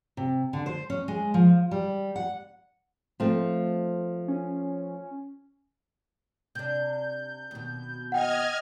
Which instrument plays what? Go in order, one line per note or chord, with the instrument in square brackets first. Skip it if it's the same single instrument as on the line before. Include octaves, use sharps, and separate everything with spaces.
[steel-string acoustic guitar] C3
D3
C5
C#4
G#3
F3
G3
F#5
[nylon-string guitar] F3 A3 C4
[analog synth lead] C#4
[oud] C3 D4 [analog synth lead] G6
[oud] D#2 B2
[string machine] D#5 F6 G#6 [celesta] F#5 G5